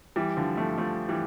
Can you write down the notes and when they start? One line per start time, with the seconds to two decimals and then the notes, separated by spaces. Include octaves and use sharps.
0.16 E3 G3
0.37 D3 F3
0.57 F3 A3
0.78 F3 A3
1.09 E3 G3